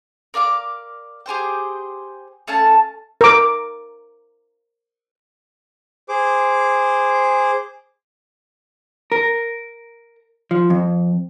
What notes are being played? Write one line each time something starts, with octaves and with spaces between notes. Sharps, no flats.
A#4 D5 F5 D6
G4 G#4 C5 G5
A3 C#4 F5 A5
A#4 D6
G#4 C5 D6
A#4
F3
F2